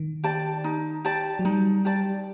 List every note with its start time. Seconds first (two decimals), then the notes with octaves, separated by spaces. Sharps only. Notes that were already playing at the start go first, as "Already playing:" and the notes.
Already playing: D#3
0.24 G4 D5 A5
0.64 D#4
1.05 G4 D5 A5
1.39 F#3
1.45 G3 D#4
1.85 G4 D5 A5